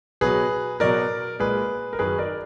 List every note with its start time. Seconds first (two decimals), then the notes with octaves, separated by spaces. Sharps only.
0.21 B2 F#3 G#4 B4
0.80 B2 F#3 A#4 D5
1.40 A#2 G#3 G#4 B4
1.93 A#4
1.99 F#2 D#3 F#3 G#4 B4
2.19 A#4 D5